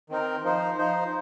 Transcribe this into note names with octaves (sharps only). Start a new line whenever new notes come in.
D#3 C4 D#4 A#4
F3 D#4 C5
F3 D#4 C5